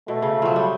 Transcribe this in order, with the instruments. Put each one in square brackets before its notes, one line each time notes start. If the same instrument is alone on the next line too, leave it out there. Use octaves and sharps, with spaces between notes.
[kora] B2 [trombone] A3
[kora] C#3
F3 F#3
G3